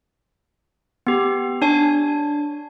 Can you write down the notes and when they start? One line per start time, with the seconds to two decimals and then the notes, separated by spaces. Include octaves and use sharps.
1.07 B3 G4
1.62 D4 C#5 G#5